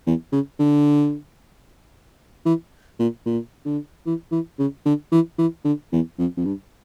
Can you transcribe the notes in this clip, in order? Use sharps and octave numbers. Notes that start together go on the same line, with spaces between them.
E2
C#3
D3
E3
A#2
A#2
D3
E3
E3
C#3
D3
E3
E3
D3
E2
F2
F2
G2